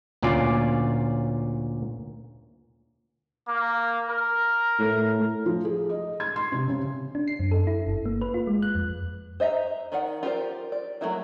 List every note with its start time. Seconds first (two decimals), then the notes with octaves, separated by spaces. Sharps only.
0.22 D2 A#2 C#4 F4 D5
3.48 A#3
4.10 A#4
4.79 A2
5.46 F3
5.65 G#4
5.89 D#5
6.20 G#6
6.36 C6
6.52 C3
6.68 C#3
7.15 D4
7.28 C7
7.40 F#2
7.51 A4
7.67 E4
7.87 G1
8.06 A#3
8.21 B4
8.34 F4
8.47 G#3
8.62 F#6
8.75 F2
9.40 C5 D#5 E5 A#5
9.92 D#3 A#4 D5 F#5
10.23 F4 G4 A#4 C5 D5
10.72 D5
11.01 F#3 A3 A#3 E4 A#4